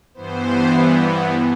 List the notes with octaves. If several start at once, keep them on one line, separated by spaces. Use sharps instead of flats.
G2 E3 B3 C5